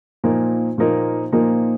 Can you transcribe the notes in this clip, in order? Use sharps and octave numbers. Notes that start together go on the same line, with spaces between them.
A#2 F3 A#3 D#4 A#4
A#2 F3 A#3 D#4 A#4
A#2 F3 A#3 D#4 A#4